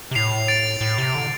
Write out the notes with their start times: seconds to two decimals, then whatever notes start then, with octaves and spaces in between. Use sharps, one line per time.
0.11 C3
0.15 A2 C7 F7
0.48 A6 D7
0.81 A2
0.98 C3
1.15 D3